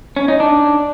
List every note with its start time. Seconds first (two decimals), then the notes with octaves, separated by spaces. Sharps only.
0.16 C#4
0.28 D#4
0.40 D4